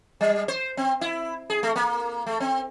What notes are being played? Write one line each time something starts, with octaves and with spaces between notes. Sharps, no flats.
G3
C5
C4
E4
G#4
A3
A#3
A3
C4